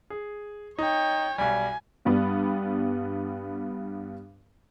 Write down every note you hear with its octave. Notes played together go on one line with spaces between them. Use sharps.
G#4
D#4 C#5 G5
B1 G3 G#5
G2 G3 B3